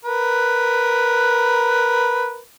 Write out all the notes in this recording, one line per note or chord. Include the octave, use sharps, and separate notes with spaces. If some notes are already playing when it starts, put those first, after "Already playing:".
A#4 B4